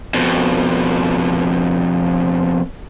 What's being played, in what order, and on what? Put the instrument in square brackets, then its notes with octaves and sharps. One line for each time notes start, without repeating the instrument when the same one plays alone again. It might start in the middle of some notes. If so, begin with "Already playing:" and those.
[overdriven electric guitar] F2 B2